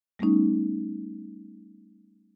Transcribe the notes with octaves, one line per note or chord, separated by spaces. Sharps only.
G3 A3 B3 C#4 D#4